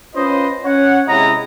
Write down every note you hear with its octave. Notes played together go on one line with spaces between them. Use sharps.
C#4 F4 B4 C5 D#5
C#4 C#5 F#5
C3 G#3 C#4 E4 D#5 A#5